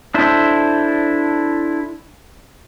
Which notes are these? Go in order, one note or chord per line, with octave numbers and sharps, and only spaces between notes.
D4 E4 A4 C5